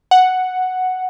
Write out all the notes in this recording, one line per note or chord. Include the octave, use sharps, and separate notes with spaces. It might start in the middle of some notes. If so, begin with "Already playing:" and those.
F#5